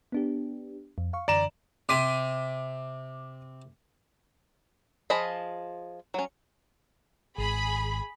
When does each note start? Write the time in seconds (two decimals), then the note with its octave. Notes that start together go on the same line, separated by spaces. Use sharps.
0.12 B3 D4 G4
0.98 F2
1.13 F5 C#6
1.28 F#2 D3 E3 D5 A#5 E7
1.89 C3 C6 D6 B6 D#7
5.10 F3 F4 G#4 D#5 B5
6.14 F#3 C#4
7.38 G#1 G#4 B5